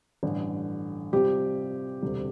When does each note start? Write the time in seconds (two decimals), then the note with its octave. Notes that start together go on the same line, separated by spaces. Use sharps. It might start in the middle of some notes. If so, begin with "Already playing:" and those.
0.23 A1 G2 D3
1.13 C3 G3 C4 F4 G4
2.02 E1 D2 C3 G3